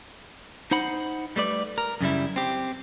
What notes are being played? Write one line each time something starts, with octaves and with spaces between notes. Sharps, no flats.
D#4 C5 F#5 B5
G3 A3 B4 D5
A#4
F#2 C#3 G3 E4
C4 G4